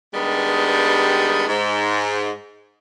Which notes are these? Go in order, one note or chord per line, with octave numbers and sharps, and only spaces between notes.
G2 D#3 G3 G#3 B3
G#2